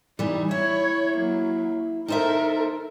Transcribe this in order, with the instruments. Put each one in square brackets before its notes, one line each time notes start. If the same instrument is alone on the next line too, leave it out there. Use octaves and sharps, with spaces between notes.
[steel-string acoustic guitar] E3 G3 [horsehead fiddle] D#4
[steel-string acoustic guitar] E4 [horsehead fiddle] C#5
[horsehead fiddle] F#3 A#3
[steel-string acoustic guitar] D#4 C5 E5 [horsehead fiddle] A4 A#4